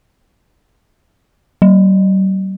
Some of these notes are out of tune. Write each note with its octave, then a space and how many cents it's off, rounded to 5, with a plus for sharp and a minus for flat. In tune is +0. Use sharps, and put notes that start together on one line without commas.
G3 -45